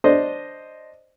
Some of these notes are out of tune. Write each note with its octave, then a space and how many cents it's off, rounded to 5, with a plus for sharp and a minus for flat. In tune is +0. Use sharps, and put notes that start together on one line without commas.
D4 +0 C5 +0 D#5 +0